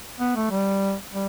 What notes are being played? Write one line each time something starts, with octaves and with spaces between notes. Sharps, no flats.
B3
A3
G3
G3